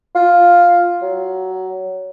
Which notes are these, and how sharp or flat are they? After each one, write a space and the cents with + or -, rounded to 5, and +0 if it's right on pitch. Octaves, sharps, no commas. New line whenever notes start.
F4 +5
F#3 +15